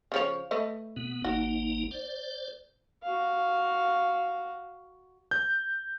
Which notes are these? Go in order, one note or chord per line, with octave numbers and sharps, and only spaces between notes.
C#3 F3 C#5
A3 B4 D#5
B2 B3
G#1 A#3 D#4 F#4
C5 D5
F#4 F5
G6